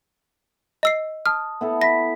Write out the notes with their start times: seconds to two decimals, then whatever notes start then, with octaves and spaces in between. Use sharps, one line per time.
0.83 D#5 E6 C7
1.26 A5 D#6 F6
1.61 B3 E4 A4
1.81 E5 B5 A#6 B6